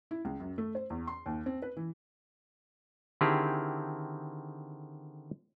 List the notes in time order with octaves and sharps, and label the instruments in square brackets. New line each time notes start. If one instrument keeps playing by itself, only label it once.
[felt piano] E4
C#2
F#2
A3
C5
E2
C6
D#2
C4
B4
E3
[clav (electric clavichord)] D3 D#3 C4 E4 G4 G#4